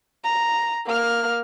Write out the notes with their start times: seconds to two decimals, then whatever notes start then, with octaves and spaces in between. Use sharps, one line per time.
0.24 A#5
0.86 A#3 F6